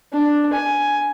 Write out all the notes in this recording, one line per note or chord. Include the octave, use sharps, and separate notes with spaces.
D4
G#5